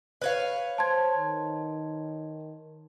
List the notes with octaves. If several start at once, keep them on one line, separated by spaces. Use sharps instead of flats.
B4 C#5 F5
C5 A5 C6 G#6
D#3